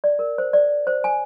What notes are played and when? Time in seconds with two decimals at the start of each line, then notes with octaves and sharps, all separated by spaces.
0.04 D5
0.19 A#4
0.38 C5
0.53 D5
0.87 C5
1.04 G#5